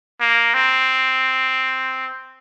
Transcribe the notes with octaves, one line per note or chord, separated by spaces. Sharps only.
A#3
C4